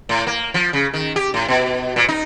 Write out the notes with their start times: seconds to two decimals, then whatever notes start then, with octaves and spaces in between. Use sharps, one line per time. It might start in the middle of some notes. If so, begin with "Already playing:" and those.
0.09 A2
0.27 A#3
0.54 F3
0.73 C#3
0.94 D#3
1.16 G4
1.34 A2
1.49 B2
1.96 A#2
2.08 D#4